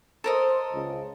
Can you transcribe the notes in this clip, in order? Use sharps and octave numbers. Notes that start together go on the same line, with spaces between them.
A4 A#4 C5 D#5
C#2